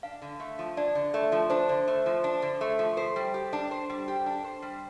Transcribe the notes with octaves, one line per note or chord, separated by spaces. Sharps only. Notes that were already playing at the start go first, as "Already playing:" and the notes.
D4 F5
D3
A3
F3
D4 D5
D3
A3
F3
D4 C5
D3
A3
F3
D4
D3
A3
F3
A4 C5
G3
G4
D4
C5
G3
G4
D4
C5
G3